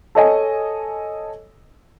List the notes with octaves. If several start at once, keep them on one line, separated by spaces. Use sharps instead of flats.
A4 C#5 D#5 G#5